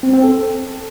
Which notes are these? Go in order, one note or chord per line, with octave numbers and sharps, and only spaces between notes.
C4
C4
A4